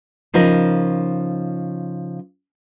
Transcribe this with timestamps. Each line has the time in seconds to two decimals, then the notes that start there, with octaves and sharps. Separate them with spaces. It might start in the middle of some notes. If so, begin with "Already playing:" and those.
0.34 C#3 F3 D#4 A#4 D#5